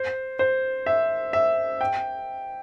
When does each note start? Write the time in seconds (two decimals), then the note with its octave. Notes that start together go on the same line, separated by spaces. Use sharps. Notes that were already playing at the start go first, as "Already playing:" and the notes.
Already playing: C5
0.39 C5
0.86 E5
1.33 E5
1.81 G5